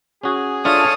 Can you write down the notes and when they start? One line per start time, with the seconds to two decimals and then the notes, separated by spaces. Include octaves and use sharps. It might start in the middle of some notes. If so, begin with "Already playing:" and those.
0.23 C#4 F#4 G#4
0.65 D4 F4 A4 C#5 E5 F5 D#6